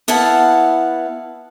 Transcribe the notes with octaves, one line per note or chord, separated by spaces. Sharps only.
B3 E4 F5 F#5 A5